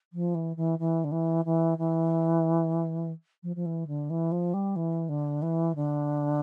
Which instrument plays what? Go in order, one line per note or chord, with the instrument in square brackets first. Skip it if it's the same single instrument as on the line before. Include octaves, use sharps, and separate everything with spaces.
[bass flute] F3
E3
E3
E3
D3
E3
E3
E3
F3
F3
E3
D3
E3
F3
G3
E3
D3
E3
D3